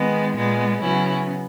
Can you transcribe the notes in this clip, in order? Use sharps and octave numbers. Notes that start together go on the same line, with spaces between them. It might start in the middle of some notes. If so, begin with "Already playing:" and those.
Already playing: D#3 G#3 B3
A#2 G#3 B3
C#3 F#3 B3 C#4 E4